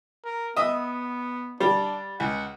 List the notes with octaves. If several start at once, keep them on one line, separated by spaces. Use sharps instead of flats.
A#4
B3 D#5 E5
G3 D4
C#2 F#5